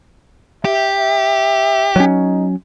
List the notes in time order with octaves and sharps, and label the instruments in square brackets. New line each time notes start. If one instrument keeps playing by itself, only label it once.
[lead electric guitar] G4 [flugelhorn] E5
[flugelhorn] E5
[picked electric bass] F#3 C#4 [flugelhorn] D#4